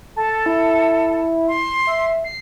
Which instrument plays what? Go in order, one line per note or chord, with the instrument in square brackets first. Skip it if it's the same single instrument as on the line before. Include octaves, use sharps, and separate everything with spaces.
[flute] A4 [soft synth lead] A5
[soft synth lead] E4
[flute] C6
[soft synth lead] E5
C7